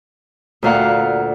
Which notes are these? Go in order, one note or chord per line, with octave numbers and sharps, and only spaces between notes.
D2 A#2 F5 F#5